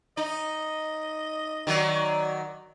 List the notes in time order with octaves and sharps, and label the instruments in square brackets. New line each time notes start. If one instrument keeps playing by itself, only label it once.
[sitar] D#4 [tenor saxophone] D#5
[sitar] D#3 F#3 [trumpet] D5